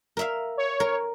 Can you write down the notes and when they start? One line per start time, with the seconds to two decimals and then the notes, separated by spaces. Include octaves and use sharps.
0.17 A#4 E5 F5
0.57 C#5
0.80 A#4